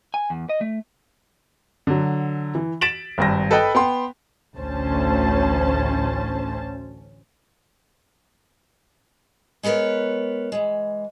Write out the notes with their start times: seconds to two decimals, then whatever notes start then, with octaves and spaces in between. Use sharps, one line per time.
0.14 G#5
0.30 E2
0.49 D#5
0.61 A3
1.87 D3 F#3
2.55 E3
2.81 A6 B6 D7 E7 F#7
3.18 G#1 G2 A#6
3.51 A4 B4 D#5 G5 B5
3.75 B3 G5 C6
4.57 A1 D2 C#4 C5 A5
9.63 G#3 B3 A#4 B4 C#5
10.52 E3 G#3